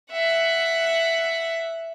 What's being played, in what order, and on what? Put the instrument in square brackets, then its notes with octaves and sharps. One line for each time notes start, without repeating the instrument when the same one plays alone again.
[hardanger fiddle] E5 F#5